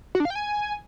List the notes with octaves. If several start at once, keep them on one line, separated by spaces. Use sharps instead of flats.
F#4
D4
F5
G5
G#5